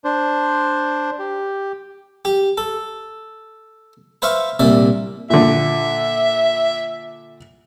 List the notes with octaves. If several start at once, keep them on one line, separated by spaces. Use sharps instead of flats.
D4 C5
G4
G4
A4
B4 C5 E5 F5 C#6
C2 A#2 D5 E5
A#2 D3 E5